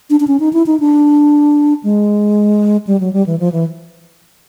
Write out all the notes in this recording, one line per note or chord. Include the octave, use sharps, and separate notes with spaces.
D4
D4
C#4
D#4
E4
D#4
D4
G#3
G3
F#3
G3
E3
F3
E3